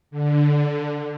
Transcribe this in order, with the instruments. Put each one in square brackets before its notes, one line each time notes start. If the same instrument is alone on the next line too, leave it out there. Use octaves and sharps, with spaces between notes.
[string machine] D3